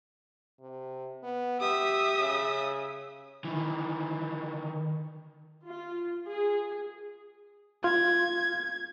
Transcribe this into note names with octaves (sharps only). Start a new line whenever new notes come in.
C3
B3
G4 E5 D#6
C#3
D#3 E3
F4
G#4
F4 G#6